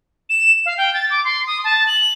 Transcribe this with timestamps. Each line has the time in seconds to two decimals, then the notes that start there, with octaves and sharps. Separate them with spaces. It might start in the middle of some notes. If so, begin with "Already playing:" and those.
0.30 E7
0.66 F5
0.77 G5
0.94 A6
1.10 D6
1.24 C6
1.47 D#6
1.64 A5
1.87 F#7